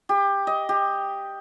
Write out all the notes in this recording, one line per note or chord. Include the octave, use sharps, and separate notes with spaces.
G4
D#5
G4